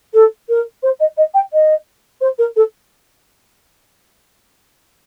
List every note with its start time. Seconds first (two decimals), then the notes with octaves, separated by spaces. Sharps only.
0.13 A4
0.49 A#4
0.83 C5
0.99 D#5
1.17 D#5
1.34 G5
1.53 D#5
2.21 C5
2.38 A#4
2.56 A4